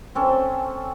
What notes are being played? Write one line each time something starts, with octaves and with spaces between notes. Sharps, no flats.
C4 C#4 A4